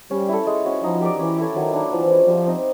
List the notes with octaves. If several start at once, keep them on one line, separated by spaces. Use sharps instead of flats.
G3 C#4
E4 A4
G#3
C#4 F#4
F3 D#4
G4 A#4 D5
E3 C#4
E4 A4 C#5
D#3 F#3
A#3 D4
E3 F3
G#3 C#4 F#4
F3 G3
C4 D#4